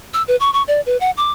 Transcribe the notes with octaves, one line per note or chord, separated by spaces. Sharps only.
E6
B4
C#6
C#6
D5
B4
F#5
D6